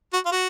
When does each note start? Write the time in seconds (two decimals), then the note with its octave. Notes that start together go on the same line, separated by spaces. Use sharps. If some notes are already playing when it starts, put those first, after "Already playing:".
0.13 F#4
0.26 F4
0.32 F#4